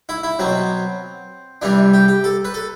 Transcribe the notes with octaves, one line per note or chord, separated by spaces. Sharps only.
E4
E4
B2 F#3 C4
C3 E3 G3 D4
G4
G4
A4
B4
A4